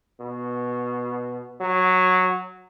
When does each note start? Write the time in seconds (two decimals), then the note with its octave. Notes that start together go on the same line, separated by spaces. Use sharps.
0.20 B2
1.61 F#3